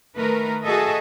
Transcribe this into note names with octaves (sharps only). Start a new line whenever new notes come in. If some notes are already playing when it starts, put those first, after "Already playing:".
D#3 A3 A#4 B4
F#4 G#4 A4 D#5 E5